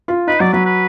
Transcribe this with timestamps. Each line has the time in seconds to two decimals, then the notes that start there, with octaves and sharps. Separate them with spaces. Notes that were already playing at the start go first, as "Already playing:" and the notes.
0.08 F4
0.27 D#4 B4
0.40 F#3 D5
0.53 F#3 B4
0.66 B4